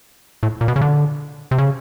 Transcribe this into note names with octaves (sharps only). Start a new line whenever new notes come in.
A2
A#2
B2
C#3
D3
C3
C#3